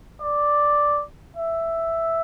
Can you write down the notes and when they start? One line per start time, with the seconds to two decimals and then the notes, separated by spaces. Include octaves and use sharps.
0.22 D5
1.37 E5